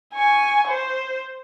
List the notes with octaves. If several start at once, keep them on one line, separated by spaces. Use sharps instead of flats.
G#5 C#6
C5